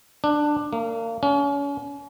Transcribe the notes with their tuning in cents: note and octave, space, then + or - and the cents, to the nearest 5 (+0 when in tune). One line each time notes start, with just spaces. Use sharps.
D4 +15
A#3 -30
C#4 +35